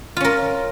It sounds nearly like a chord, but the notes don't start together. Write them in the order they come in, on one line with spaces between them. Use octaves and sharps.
F4 C#4 A#4